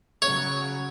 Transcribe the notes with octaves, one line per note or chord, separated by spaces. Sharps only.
C#3 F#3 C#5